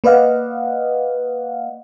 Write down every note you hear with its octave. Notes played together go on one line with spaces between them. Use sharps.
A#3 B4 D5 D#5 F5 F#5